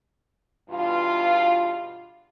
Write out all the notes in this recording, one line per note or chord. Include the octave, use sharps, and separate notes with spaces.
E2 G2 B2 F4